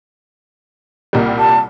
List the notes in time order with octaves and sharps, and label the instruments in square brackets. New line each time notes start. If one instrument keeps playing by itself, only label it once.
[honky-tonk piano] C2 A#2 G3
[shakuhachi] A5